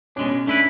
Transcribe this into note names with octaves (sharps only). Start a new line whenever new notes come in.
B2 G#3 C#4 D4
A3 D4 E4 B4